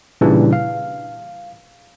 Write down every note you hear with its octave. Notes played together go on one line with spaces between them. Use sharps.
A#2 C#3 E3 G3 D4
F5